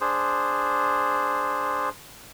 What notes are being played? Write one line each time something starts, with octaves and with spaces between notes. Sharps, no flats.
D4 G#4 C5